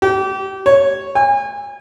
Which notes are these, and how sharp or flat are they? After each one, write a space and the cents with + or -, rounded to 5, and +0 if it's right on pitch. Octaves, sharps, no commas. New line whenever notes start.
G4 -30
C#5 -5
G#5 -35